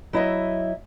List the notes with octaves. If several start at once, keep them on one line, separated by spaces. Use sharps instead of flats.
F#3 E4 D#5 E5